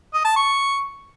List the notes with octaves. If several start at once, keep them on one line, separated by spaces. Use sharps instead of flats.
D#5
A5
C#6